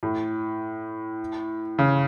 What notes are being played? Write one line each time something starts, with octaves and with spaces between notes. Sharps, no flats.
A2
C#3